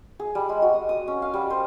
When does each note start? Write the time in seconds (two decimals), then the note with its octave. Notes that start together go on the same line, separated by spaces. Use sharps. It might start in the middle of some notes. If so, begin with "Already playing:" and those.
0.19 G#4
0.35 G3
0.49 G#3
0.62 F#4
0.74 D#6
0.89 D#6
1.08 C#4
1.22 F5
1.34 G3
1.50 C5